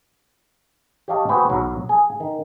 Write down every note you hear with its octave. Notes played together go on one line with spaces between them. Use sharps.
G4 C#5 D#5 F5 G5 A5
C4 F#4 G#4 B4 G5
B1 F#3
G#4 G#5
D#3